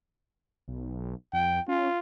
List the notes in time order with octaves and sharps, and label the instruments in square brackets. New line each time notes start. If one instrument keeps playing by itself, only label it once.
[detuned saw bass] B1
[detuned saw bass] F2 [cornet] G5
[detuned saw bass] C#4 [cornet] F4